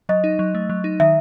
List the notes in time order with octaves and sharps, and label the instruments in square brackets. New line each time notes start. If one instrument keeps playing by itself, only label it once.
[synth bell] F#3 [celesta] D#5
[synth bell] D#4
F#3
A3
F#3
D#4
[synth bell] D#3 [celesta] E5